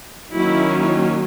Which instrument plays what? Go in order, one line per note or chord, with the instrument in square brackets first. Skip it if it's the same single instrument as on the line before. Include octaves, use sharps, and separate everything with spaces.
[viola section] D#3 F#3 A#3 C#4 E4